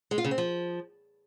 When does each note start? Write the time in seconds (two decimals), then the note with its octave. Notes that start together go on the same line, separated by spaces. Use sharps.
0.11 G#3
0.18 F4
0.24 C#3
0.31 C4
0.38 F3